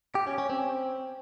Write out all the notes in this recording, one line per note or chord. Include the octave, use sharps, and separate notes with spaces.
G4
C#4
C#4
C4